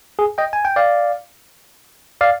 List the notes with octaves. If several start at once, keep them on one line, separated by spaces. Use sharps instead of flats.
G#4
D#5 G5
G#5
G5
D5 F5
D5 F5